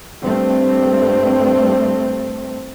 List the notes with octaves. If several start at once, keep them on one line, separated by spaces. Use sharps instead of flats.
G2 A3 C4